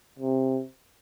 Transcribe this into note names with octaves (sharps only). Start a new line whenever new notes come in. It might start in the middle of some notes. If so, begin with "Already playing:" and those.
C3